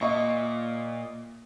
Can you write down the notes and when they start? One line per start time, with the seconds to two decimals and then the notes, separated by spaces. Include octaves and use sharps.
0.01 A#2 D#5 E5 C#6